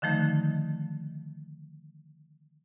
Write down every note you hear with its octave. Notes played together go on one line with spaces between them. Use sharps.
D3 D#3 F3 A3 D#4